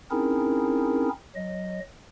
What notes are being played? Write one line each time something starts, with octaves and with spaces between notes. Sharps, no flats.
C4 C#4 D#4 E4 G#4 A#4
F#3 D#5